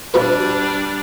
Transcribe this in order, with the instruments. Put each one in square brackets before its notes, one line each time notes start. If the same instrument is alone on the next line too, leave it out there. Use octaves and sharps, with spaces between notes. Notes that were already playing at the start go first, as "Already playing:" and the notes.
[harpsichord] B2 F3 B4 [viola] G3 D4